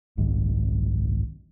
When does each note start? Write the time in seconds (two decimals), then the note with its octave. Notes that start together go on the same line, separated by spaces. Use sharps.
0.17 F#1 C2 G#2 D#3